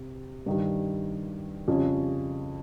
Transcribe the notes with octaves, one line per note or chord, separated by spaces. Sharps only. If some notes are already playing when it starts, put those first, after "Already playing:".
Already playing: C3
G2 D#3 G3
F2 C#3 G3 C#4